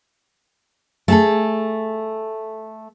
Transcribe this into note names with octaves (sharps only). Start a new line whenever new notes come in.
A3 G#4 A4